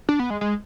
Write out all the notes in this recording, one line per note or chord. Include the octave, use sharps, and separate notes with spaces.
D4
B3
G#3
G#3